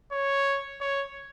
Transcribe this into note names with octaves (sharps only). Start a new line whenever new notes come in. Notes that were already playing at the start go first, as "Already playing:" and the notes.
C#5
C#5